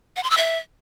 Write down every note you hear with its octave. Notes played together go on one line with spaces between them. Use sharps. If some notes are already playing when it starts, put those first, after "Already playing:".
F#5
C6
E6
E5